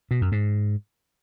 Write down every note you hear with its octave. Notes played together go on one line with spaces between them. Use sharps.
B2
F#2
G#2